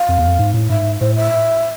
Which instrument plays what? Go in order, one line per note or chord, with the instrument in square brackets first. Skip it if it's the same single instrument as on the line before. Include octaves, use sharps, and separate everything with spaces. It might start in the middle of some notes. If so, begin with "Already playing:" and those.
Already playing: [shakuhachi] F5
[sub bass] F2
E2
F2
G#2
A2
[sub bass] G#2 [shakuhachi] E5
[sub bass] A2 [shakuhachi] C5
[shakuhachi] E5